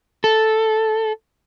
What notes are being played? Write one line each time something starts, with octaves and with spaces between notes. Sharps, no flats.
A4